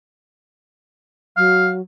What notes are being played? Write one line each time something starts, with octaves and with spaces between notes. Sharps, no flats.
F#3 F5